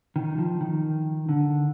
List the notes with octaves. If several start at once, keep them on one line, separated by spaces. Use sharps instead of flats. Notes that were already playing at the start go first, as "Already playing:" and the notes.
D#3
F3
D#3
D3